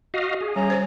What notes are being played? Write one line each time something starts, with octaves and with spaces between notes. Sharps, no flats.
F#4 D#5 F5
G#4
G3 C#4 A#5
C5 C#5